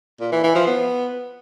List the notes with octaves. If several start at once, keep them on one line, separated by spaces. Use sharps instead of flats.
A#2
E3
E3
F3
B3